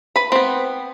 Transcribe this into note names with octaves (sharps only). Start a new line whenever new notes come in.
B4 B5
B3 C4